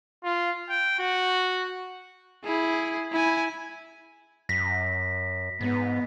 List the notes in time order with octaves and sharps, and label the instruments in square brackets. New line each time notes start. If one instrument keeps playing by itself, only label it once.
[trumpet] F4
G5
F#4
[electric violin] E4 G#4
E4 G#5
[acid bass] F#2 [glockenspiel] A#6 B6
[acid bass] G#2 [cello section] B3